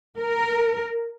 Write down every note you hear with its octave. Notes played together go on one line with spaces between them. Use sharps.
A#4